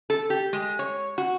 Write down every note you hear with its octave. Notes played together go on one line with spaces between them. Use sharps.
A4
G4
G#3
C#5
F#4